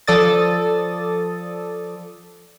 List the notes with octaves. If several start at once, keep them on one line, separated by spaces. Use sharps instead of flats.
F3 A4 D5 D#6 A6